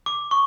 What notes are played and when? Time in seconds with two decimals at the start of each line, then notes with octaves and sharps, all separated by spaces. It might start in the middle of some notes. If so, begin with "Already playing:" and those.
0.06 D6
0.31 C#6